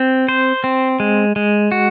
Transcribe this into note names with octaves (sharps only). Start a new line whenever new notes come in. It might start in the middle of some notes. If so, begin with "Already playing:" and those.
Already playing: C4
C5
C4
G#3
G#3
F#4